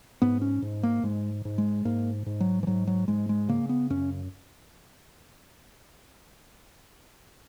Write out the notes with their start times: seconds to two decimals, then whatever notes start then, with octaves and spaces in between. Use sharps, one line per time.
0.22 G#2 B3
0.42 C#4
0.62 G#2
0.83 A#3
1.03 G#2 G#3
1.45 G#2
1.58 G#3
1.85 G#2 A#3
2.26 G#2
2.40 F#3
2.63 E3
2.67 G#2 F#3
2.87 F#3
3.08 G#2 G#3
3.29 G#3
3.49 C#3 A#3
3.69 B3
3.90 F#2 C#4